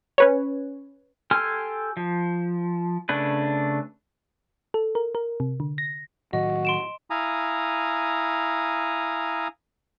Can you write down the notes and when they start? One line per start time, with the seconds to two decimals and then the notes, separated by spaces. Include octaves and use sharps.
0.18 C#4 B4 C#5
1.31 G4 A4 G#5 C6 F6
1.97 F3
3.09 C#3 A3 D4 B4
4.74 A4
4.95 A#4
5.15 A#4
5.40 C3
5.60 D3
5.78 A#6
6.33 A2 D#3 F#3 F#4 D#5
6.65 C6 D7 E7
7.10 E4 F5 G#5 A#5 D#6